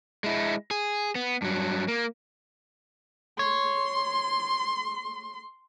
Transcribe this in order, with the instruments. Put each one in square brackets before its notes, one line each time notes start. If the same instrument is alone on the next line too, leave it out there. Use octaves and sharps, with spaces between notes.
[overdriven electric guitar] G#3 E4
G#4
B3
G2 F#3
A#3
[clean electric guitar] C#5 [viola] C6